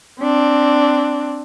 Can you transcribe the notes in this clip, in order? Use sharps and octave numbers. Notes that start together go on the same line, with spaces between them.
C4 D4